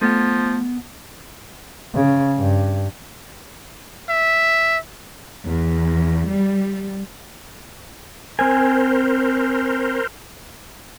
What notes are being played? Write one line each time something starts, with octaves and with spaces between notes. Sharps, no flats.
F3 A3 B3 F#5
C#3
G2
E5
E2
G3
C4 A#4 C5 G#5